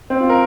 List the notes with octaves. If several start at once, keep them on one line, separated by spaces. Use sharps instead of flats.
C4
F4
A#4